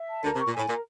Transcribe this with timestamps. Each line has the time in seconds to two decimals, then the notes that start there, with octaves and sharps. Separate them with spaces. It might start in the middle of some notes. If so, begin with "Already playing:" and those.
Already playing: E5
0.09 A5
0.23 D2 D3 A#4
0.35 C3
0.38 C#6
0.47 A#2
0.54 A2 G#5
0.68 A#2 A#4